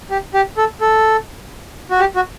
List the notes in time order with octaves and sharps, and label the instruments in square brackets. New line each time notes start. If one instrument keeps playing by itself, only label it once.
[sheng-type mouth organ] G4
G4
A4
A4
F#4
G4
F#4